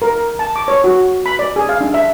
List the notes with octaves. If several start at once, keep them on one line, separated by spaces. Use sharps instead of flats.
A#4
A5
D6
C#5
F#4
B5
D5
G#4
F5
D4
E5